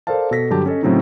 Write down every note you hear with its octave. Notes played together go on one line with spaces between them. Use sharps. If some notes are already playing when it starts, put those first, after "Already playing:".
A4 A#4 C5 D5 F5 A5
B2 A4 A#6 B6
G2 D3 F#3 G4 A5
C#4 A4 D#5
A2 C#3 F#3 C4 C#4 D#4